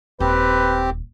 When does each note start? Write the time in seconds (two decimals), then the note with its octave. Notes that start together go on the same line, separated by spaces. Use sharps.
0.20 D#1 C4 G4 B4